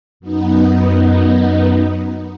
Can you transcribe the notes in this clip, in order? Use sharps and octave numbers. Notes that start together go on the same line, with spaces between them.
F#2 B3 D#4